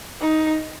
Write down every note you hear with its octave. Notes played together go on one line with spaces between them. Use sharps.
D#4